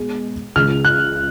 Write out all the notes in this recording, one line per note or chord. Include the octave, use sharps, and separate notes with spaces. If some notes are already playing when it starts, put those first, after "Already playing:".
Already playing: B2 G#3
C#2 C#3 G#3 F6
F#6